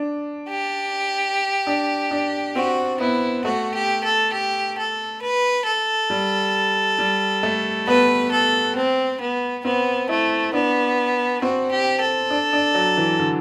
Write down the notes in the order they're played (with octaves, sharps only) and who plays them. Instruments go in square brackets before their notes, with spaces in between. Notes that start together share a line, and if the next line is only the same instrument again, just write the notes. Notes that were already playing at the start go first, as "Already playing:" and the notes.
Already playing: [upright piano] D4
[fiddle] G4
[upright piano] D4
D4
[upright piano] C4 [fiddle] F#4
[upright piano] B3 [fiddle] E4
[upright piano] A3 [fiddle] F#4
[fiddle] G4
A4
G4
A4
B4
A4
[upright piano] G3
G3
A3
[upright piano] B3 [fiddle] B4
[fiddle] A4
C4
B3
[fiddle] B3 [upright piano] C4
[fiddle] A3 [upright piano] E4
[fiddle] B3 [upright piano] D4
[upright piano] C4 [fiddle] F#4
[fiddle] G4
A4
[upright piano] D4
D4
F#3
E3
D3